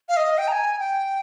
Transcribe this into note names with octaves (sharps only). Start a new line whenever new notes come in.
F5
D#5
G5
A#5
G#5
G5